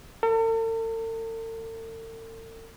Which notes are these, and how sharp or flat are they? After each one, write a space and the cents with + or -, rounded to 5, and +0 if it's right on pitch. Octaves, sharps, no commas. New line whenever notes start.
A4 +45